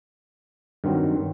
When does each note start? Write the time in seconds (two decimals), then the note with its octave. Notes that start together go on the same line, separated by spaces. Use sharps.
0.84 G2 D#3 F#3 C4